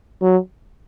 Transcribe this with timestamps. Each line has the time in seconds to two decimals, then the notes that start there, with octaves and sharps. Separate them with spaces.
0.22 F#3